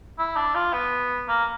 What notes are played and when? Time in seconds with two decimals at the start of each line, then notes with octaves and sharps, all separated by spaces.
0.18 E4
0.36 D4
0.55 F4
0.73 B3
1.28 A#3